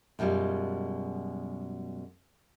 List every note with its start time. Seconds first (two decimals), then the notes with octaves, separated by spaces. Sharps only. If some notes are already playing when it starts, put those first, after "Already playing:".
0.19 F#2 B2 G3 G#3 F4